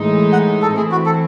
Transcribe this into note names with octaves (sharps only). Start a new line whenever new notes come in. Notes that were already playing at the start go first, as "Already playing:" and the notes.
Already playing: A2 E3 G#3 D#4
F#5
A4
E3 A3 C4 E4 G#4
F#4
A4